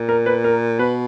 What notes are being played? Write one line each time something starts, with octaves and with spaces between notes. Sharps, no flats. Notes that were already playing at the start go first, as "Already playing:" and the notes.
Already playing: A#2
A#4
B4
A#4
B2 B4